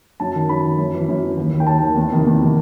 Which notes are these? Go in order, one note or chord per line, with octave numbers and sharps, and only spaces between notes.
F#2 A5
D#3
F#2 B5
D#3
F#2
E3
F#2
E3
D#2
D#3
G5
D#2 A5
D#3
E2
C3 D#3
E2
C3 D#3